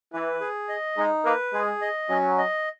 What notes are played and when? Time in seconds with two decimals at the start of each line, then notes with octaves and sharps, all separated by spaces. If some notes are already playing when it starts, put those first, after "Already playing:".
0.13 E3 B4
0.41 G#4
0.69 D#5
0.97 G#3 D#4
1.25 A#3 B4
1.53 G#3 G#4
1.82 D#5
2.09 F#3 C#4
2.38 D#5